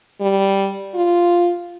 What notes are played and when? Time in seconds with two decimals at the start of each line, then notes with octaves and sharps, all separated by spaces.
0.21 G3
0.95 F4